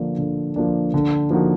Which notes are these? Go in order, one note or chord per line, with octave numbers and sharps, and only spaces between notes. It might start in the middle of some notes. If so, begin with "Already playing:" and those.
Already playing: D3 F3 A#3 D4
D3
F3 A#3 D4
D3
F3 A#3 D#4 F#4